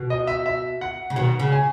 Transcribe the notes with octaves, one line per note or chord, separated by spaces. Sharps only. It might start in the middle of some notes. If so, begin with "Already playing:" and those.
Already playing: B2
D#5
E5
E5
F#5
C#3
B2 D#3 F#5
C#3
G#5